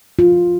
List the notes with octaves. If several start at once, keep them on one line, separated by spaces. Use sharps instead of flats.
F4